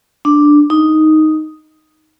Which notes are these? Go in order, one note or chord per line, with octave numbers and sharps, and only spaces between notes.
D4
D#4